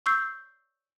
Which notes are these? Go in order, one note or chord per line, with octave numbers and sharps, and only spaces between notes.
C#6 E6 G6 C7